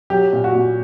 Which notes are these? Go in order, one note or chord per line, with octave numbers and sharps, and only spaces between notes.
F#3 G4
A#2
F#4
A#2